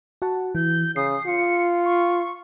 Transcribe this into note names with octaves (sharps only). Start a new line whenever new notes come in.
F#4 F#5 A5
E3 G6
C#3 D#6 C7
F4 C#7
C#6